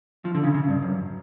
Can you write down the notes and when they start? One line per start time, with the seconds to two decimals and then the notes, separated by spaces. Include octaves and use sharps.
0.25 F3
0.35 D3
0.43 C#3
0.54 C#3
0.68 G2
0.82 F#2